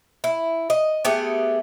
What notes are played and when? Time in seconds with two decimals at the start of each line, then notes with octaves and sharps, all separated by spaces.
0.24 E4
0.70 D#5
1.05 A3 B3 G4 G#4